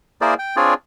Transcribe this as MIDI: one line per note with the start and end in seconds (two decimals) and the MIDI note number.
0.21 0.34 58
0.21 0.34 64
0.21 0.34 68
0.21 0.34 70
0.21 0.34 72
0.21 0.34 74
0.39 0.56 79
0.56 0.74 60
0.56 0.74 62
0.56 0.74 65
0.56 0.74 68
0.56 0.74 73
0.56 0.74 74